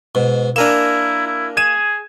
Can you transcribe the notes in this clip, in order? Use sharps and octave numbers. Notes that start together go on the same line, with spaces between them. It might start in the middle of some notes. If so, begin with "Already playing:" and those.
G#2 B2
A#3 D4 E4 A#4 G#5 A#5 E7
E4
G#4 G#6 D#7 E7